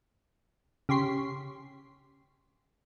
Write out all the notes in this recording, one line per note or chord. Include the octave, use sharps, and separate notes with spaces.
C#3 G4 C#5 C6 B6 C7